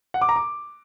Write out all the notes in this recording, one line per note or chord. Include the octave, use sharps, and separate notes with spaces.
F#5
D6
A#5
D6